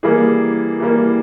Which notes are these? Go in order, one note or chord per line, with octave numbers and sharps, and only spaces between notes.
E3 G3 A#3 G#4
E3 G3 A#3